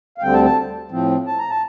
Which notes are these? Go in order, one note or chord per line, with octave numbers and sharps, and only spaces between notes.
F5
D2 D3 G3 C4 G5
A5
A5
A2 F3 C4
A5
A#5
A5